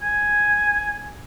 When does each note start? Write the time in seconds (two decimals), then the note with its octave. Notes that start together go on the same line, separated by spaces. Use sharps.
0.02 G#5